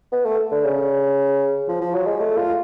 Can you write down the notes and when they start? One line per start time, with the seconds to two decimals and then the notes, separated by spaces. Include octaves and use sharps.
0.12 B3
0.25 A3
0.52 D3
0.64 C#3
1.68 F3
1.81 F3
1.94 F#3
2.07 G#3
2.20 A3
2.38 F4